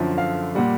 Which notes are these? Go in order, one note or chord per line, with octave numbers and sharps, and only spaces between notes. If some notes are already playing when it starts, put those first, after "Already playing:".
Already playing: F#2 D3 F3 E5
F5
A#2 G3 F#5